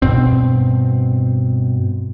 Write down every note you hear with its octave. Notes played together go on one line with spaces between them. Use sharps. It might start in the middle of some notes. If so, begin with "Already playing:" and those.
G2 B2 C4